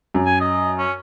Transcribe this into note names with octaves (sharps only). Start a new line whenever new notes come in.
F#2
G#5
D#5
C#4